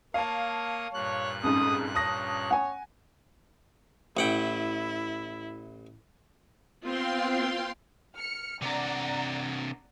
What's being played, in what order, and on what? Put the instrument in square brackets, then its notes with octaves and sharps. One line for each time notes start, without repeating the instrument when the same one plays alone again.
[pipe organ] A#3 C#5 D#6 [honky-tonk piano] F5 A5
[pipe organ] G2 A#2 F#6 [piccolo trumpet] C#5
[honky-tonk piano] F2 G#2 [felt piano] C#4 [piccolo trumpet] D#6
[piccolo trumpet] C#5 [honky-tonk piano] A5 D#6 A#6
[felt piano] F#5 G#5
[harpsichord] A1 F#5 G5 [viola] E4
[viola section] B3 C4 F4 [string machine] F5 G5 C6
[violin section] F6 C#7
[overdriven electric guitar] C3 D4 [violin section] D5 F#5 A#5